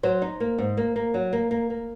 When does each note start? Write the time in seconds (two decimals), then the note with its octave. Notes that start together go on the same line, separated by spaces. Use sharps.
0.03 F#3 C5
0.22 D#4
0.40 A#3
0.59 G#2
0.77 A#3
0.96 A#3
1.14 F#3
1.33 A#3
1.51 A#3
1.70 A#3